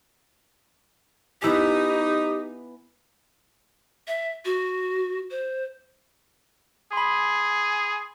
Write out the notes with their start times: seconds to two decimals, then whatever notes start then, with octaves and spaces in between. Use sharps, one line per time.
1.42 B3 D#4 E4 G4 G#5
4.07 E5
4.45 F#4
5.31 C5
6.93 G#4 B5 C6